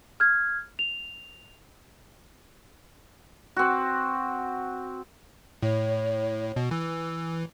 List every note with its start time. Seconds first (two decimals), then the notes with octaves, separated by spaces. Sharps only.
0.20 F6 G#6
0.79 F7
3.56 C4 F#4
5.63 A2 C#5
6.56 B2
6.71 E3 E6